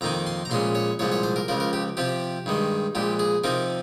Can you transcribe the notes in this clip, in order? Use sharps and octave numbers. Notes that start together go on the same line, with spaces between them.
F2 D#3 A#3 D#4 A#5
C6
A#5
A#1 A#2 G#3 C#4 C6
C#5
C2 A#2 F3 G#3 C#5
C#5
C5
A#4
C#2 C#3 F3 A#4
A#4
G4
C3 F3 C4 G4
G2 D#3 G#3
A#1 A#2 G#3 G4
G#4
C3 F3 C4 D#4 A#4